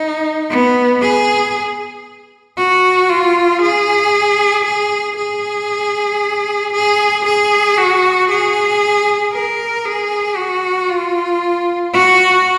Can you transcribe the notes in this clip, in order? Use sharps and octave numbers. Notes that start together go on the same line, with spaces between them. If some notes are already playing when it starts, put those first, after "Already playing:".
Already playing: D#4
B3
G#4
F#4
F4
G#4
G#4
G#4
G#4
G#4
F#4
G#4
A#4
G#4
F#4
F4
F#4